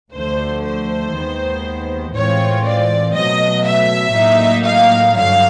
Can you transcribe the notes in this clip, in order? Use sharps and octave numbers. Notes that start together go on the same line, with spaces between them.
D2 D3 F3 A3 C5
C5
D#2 D#3 G#3 B3
A2 E3 G#3 C4 F4 C#5
D5
B2 F#3 A3 D#5
E5
A2 F#3 A#3 D#4
F5
G2 D3 F#3 F5